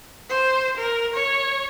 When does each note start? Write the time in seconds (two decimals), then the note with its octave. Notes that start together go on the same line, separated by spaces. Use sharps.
0.29 C5
0.77 A#4
1.14 C#5